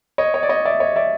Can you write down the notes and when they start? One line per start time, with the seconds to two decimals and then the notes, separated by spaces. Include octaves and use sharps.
0.18 C#5 D#5
0.34 C#5 D#5
0.43 D5
0.49 C#5 D#5
0.65 D5 E5
0.80 C#5 D#5
0.96 D5 E5